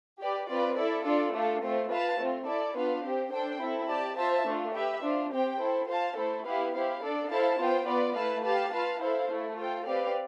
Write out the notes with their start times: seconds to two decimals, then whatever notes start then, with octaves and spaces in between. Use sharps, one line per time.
0.20 G4 B4 D5
0.48 C4 F4 B4 D5
0.76 E4 A4 D5
1.04 D4 F4 A4 D5
1.33 A3 D4 F4 A4
1.61 A3 C4 F4 C5
1.89 F4 B4 F5 A5
2.19 A3 C4 F4
2.46 E4 A4 D5 A5
2.75 B3 D4 F4 B4 F5
3.03 C4 G4 C5
3.32 D4 A4 C5 G5
3.60 C4 E4 A4
3.88 G4 D5 A5
4.17 F4 C5 E5 A5
4.46 A3 D4 F4
4.74 G4 B4 E5
5.02 D4 F4 C5
5.32 C4 G4 C5 G5
5.60 E4 A4 C5
5.89 F4 C5 F5 A5
6.16 A3 E4 A4 C5
6.45 B3 E4 G4 B4 F5
6.73 E4 G4 C5 F5
7.01 D4 A4 D5
7.30 E4 A4 C5 F5 A5
7.59 B3 F4 C5 G5
7.87 B3 F4 B4 D5
8.15 A3 E4 B4 F5 A5
8.44 G4 B4 F5 A5
8.72 F4 B4 F5 A5
9.01 E4 A4 C5 F5
9.29 A3 E4 A4
9.57 F4 A4 C5 G5
9.87 C4 G4 B4 D5 F5